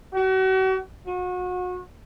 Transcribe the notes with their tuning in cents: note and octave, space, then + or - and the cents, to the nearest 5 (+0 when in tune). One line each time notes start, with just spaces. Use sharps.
F#4 +40
F#4 -35